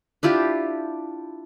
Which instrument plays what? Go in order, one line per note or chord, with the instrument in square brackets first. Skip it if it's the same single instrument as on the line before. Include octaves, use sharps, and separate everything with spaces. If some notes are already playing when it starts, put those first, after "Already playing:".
[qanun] D4 E4 F4 G4